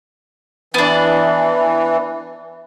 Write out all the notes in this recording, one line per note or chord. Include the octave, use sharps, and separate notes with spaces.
E3 B3 D4